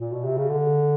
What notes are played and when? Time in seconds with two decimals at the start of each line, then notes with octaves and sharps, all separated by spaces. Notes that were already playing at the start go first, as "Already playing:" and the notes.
0.00 A#2
0.12 B2
0.25 C3
0.37 C#3
0.49 D3